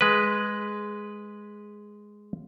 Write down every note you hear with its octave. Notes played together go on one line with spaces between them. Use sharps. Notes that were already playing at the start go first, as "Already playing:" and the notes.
G#3 B4